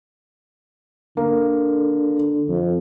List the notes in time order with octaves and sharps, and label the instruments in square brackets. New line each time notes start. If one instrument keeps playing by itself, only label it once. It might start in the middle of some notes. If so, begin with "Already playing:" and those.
[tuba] D3 [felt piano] A#3
[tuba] F2